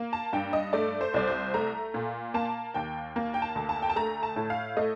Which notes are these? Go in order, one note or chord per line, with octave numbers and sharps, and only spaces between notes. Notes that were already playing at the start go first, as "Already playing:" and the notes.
Already playing: A#3
A5
G2 G5
D#5
A3 D5
C5
C2 D5
C5
A3 A#5
A#2
A#3 A5
D#2 G5
A#3
G5
A5
D2
A5
G5
A5
A3 A#5
A5
A2
F5
A3 D#5